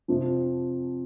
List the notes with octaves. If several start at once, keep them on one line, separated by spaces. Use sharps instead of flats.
F2 C3 F3